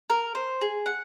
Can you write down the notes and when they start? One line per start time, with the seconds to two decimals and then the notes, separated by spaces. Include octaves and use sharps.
0.10 A#4
0.35 C5
0.61 G#4
0.86 F#5